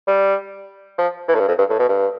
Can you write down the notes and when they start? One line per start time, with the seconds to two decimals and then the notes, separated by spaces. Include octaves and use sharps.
0.08 G3
0.98 F3
1.28 E3
1.34 A2
1.39 G2
1.48 F2
1.58 G2
1.70 A2
1.79 B2
1.89 G2